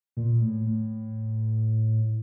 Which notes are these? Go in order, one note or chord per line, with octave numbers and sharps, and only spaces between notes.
A#2
A2
A2